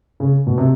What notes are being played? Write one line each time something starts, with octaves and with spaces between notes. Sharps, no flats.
C#3
B2
C3